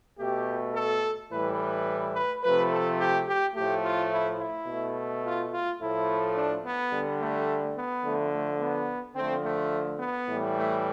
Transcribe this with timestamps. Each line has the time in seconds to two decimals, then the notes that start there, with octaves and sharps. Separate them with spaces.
0.19 B2 A3 G4
0.75 A4
1.31 A2 E3 G3 B4
1.59 B4
2.15 B4
2.43 C3 F3 A3 B4
2.71 A4
2.99 G4
3.27 G4
3.55 A2 F3 A3 G4
3.83 F4
4.12 E4
4.39 E4
4.67 B2 A3
5.24 F4
5.51 F4
5.79 A2 F3 A3 E4
6.35 D4
6.64 B3
6.91 D3 G3
7.20 A3
7.76 B3
8.04 D3 F3 A3
8.32 A3
8.60 B3
9.15 D3 F3 A3 C4
9.43 A3
9.99 B3
10.28 A2 E3 G3
10.56 A3